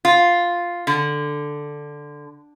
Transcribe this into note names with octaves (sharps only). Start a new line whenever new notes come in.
F4
D3